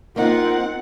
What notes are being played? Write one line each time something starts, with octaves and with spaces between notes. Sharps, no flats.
A#3 C4 D#4 F4 F#5